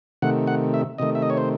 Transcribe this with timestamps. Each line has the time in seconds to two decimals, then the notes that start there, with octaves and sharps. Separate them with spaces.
0.22 C3 D#3 A3 F#5
0.47 F#5
0.74 E5
0.98 C3 D#3 A3 D#5
1.15 E5
1.22 D#5
1.30 C#5
1.37 C5